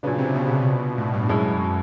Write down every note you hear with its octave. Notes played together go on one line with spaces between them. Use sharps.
A#2 C#3 F#3 B3 D4
C3
B2
A2
G2
F#2 B2 G#3 C#4 E4
F#2